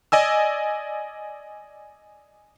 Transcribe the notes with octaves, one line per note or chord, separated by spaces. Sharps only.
D5 D#5 G#5 E6